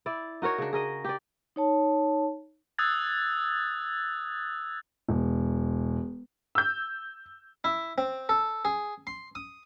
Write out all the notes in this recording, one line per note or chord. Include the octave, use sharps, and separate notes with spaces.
E4 D5
D#4 F#4 A#4 C#5
C#3 D4
G#4 A#4 D#5
G4 D5
D#4 C#5 A5
D#6 E6 F#6 G#6 A6
E1
E6 G6
E4
C4
A4
G#4
C6
D#6